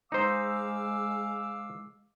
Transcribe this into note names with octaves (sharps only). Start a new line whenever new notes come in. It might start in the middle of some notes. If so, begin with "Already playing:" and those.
G#3 D#4 C5 F5 D6 E6